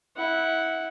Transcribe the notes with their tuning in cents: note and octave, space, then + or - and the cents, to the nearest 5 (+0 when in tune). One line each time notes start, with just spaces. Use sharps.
E4 -20 F#5 +0